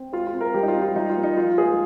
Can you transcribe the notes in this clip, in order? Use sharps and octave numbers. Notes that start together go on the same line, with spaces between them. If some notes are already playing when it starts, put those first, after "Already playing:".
Already playing: C4
G#3 F4
F4
C4
A#4
G3 G4
D#4
F4
C4
F4
G3 D#4
F4
A#3
D#4
F3 F4
G#3 G#4